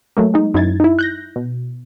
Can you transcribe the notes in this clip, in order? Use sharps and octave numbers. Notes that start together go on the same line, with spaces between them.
F#3 A3 A#3
G#3 D#4
F#2 D#4 E4 G#6 A6
D#4 E4
F#6 G6 A#6
B2